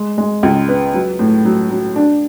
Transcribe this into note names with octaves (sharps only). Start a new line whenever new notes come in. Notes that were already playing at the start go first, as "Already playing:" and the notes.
Already playing: G#3
G#3
C#2
B3
F#3
A2
F#3
F#3
D4